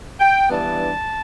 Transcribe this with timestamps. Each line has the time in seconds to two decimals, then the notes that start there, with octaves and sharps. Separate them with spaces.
0.20 G5
0.49 G2 E3 B3 D4 A5